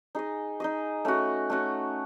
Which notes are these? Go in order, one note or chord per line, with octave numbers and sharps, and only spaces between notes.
D#4 G#4 D#5
D#4 G#4 D#5
A3 C#4 F#4
A3 C#4 F#4